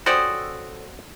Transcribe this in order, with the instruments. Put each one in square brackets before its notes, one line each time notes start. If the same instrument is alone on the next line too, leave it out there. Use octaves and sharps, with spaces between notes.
[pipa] C#4 G4 C5 [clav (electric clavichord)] F#4 D5 [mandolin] A4 D#6 E6